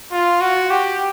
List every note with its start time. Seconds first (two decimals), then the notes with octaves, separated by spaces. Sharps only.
0.12 F4
0.41 F#4
0.70 G4